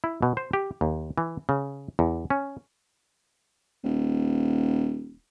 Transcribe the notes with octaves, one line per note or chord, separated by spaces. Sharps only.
E4
B2
C5
G4
D#2
E3
C#3
E2
C#4
D#1